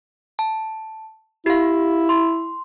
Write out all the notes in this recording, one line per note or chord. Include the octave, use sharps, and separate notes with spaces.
A5
E4 G4 F5
C6